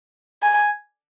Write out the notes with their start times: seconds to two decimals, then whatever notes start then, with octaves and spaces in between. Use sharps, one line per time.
0.43 G#5